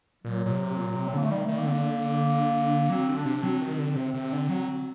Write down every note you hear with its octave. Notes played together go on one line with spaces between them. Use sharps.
A#2 F#3
A#2
C3
A#2
C3
C4
D3 A#3
A3
D#3 G3
D#3 A3
A#3
D3 A#3 C4
F#3 C4
D3
D4
C3
F#3 C4
D#3
D3
C3
C3
D3
F#3